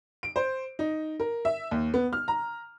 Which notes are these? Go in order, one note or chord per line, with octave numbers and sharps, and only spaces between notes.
D7
C5
D#4
A#4
E5
D#2
B3
F6
A#5